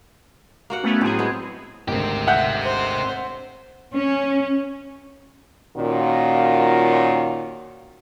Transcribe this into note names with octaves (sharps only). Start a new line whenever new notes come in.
A#3 F#4 F#5
A3 B3 C#4
A2 F#3 C4 G#4
G#3 B3
G#1 D2 C4 G4
E5 F#5 G6
C5
C#4
A#2 D#3 C#4 F4 F#4